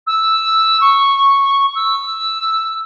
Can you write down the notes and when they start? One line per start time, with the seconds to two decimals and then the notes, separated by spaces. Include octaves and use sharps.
0.06 E6
0.81 C#6
1.75 E6